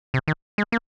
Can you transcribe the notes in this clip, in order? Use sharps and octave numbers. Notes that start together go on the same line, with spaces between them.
C3
D#3
G#3
A#3